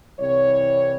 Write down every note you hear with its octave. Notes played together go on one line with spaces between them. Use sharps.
C2 C3 E3 G3 C#5